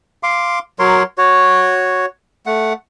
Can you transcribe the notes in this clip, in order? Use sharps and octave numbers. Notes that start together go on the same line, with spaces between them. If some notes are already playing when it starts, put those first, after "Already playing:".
F5 C6 D6
F#3 A#4 C#5 C6
F#4 C#5
A3 F#5